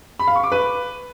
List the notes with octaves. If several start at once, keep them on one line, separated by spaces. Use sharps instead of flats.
B5
F5
C#6
D6
B4